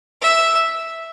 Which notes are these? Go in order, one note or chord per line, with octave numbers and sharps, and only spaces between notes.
E5